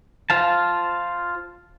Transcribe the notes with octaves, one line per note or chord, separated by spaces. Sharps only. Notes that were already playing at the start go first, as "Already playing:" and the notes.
F4 C5 F5 A5